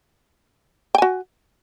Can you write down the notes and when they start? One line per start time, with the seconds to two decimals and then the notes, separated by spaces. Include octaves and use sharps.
0.95 G5
0.98 G#5
1.02 F#4